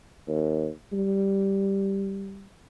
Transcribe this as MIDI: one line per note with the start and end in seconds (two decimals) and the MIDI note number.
0.28 0.69 39
0.93 2.49 55